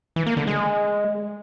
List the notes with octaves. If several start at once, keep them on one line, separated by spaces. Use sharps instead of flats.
E3
A#3
D3
G#3